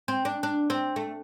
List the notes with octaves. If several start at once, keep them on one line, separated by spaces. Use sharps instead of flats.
C4
D4
D4
C4
A3